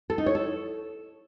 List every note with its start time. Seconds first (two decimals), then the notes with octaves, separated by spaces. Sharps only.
0.10 A4
0.18 D#4
0.26 C#5
0.35 A4